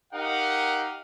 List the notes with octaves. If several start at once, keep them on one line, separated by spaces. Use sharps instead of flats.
D#4 G4 A#4 F5 F#5